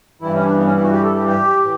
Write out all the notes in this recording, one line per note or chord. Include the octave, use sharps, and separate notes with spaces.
G2 E3 G3 E4
C#4
E4
D4
B3
C#4
E4
F#4
G4
A4
G4
G4
A2 E3